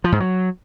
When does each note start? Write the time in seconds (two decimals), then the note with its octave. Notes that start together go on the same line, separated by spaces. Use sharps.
0.04 F3
0.12 G#2
0.20 F#3